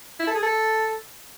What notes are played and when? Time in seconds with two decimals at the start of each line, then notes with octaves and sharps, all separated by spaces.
0.19 E4
0.27 A4
0.35 G#4
0.43 A4